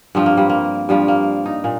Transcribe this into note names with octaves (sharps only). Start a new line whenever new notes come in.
G2 F3 C4
A#3
G3
A#3
G2 F3 G3
A#3
D#4
A#2